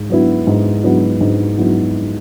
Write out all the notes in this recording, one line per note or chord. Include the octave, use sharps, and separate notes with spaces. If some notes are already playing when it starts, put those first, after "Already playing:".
Already playing: G#2
F#3 B3 E4
G#2
F#3 B3 E4
G#2
F#3 B3 E4